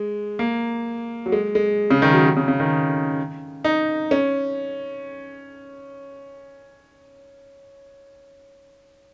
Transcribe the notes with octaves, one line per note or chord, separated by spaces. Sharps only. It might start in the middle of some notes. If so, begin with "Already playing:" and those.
Already playing: G#3
A#3
F#3
G#3
G#3
C#3
D#3
F#3
F#3
C#3
C#3
D#3
D#4
C#4